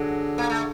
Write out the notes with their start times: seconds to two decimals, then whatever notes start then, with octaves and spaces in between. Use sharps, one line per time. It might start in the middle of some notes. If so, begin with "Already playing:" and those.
Already playing: D3 F#3 G#3
0.38 A#3
0.50 A3